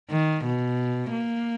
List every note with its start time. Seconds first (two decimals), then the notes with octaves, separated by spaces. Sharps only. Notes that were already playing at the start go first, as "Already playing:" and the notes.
0.10 D#3
0.44 B2
1.12 A#3